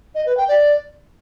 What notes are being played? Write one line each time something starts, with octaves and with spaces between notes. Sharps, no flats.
D#5
B4
G5
D5